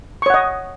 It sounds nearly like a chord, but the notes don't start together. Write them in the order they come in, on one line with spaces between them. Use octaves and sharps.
C#6 C#5 F#5 D#5